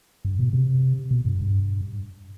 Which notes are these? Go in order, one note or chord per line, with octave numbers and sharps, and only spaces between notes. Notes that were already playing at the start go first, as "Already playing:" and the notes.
G2
B2
C3
B2
G2
G2